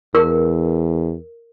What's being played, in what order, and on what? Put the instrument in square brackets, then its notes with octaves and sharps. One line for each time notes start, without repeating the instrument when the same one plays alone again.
[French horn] E2 [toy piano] A#4